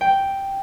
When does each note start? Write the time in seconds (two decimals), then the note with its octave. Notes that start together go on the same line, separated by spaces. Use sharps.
0.01 G5